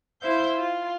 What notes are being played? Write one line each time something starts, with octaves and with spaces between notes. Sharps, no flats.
E4 C5 E5 F5 G6
F4